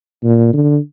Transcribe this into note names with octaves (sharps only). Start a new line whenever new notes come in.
A#2
D3